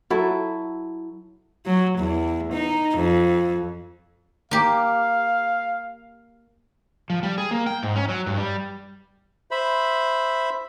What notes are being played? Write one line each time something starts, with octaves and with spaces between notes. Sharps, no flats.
F#3 E4 A4
F#3
E2
D#4
F2
A#3 G4 F5
F3
G3
G#4
A#3
G5
G#2
C#4
F#3
G2
G3
C5 E5 B5